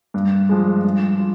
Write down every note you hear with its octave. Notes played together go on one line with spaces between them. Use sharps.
G2
F3 G#3
G2
F4